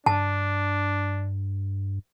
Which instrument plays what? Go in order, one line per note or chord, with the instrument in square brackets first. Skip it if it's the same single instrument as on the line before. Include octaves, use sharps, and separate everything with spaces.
[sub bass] G2 [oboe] D4 [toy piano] A5